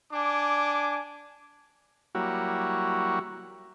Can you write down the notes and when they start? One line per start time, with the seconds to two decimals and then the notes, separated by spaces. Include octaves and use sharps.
0.12 D4 G#5 D6
2.15 F#3 G3 A#3 E4 F#4 C#5